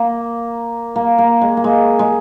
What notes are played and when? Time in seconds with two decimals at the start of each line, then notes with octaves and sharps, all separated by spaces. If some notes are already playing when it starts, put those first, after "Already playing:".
Already playing: A#3
0.96 A#3
1.18 A#3
1.41 G#3
1.57 A#3
1.64 G#3
1.99 G#3